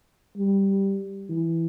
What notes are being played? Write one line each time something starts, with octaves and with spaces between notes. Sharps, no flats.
G3
E3